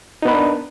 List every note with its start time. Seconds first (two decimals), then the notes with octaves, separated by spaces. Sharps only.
0.22 D#4
0.25 B3
0.28 B4
0.31 A#4
0.34 D4